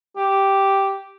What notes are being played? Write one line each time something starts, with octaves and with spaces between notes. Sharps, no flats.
G4